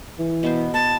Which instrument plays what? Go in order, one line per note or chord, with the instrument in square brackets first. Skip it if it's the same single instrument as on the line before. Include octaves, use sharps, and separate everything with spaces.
[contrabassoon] E3
[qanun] B2 B3 C5
[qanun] B3 [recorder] A5